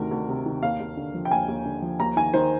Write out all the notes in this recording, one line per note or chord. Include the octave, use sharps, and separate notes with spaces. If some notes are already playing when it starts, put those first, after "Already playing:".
Already playing: D2 C3 D#3 A#4
D2
C3
D#3
D#2 F5
D#2
D3
F3
G5
D#2 G#5
D#2
D3
F3
D#2 A#5
D#3 G#5
D#3 C5